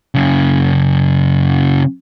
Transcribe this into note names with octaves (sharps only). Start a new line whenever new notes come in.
F#2 C#3